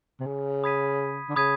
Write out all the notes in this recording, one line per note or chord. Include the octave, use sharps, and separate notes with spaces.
C3
C#3
B5 D#6 G#6 B6 D#7
D3
C#3 B5 D#6 G#6 B6 D#7